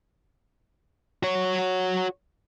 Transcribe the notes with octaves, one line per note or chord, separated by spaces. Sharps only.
F#4 C#5